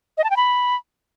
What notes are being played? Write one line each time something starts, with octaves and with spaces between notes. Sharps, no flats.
D#5
A5
G5
B5